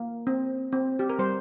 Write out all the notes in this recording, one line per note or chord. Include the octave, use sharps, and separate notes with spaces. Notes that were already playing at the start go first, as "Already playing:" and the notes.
Already playing: A#3
C4
C4
G4
A#4
G3 C5